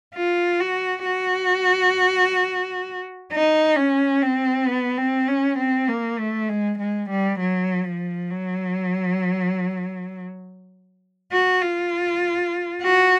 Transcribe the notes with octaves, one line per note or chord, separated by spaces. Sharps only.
F4
F#4
F#4
D#4
C#4
C4
B3
C4
C#4
C4
A#3
A3
G#3
G#3
G3
F#3
F3
F#3
F#4
F4
F#4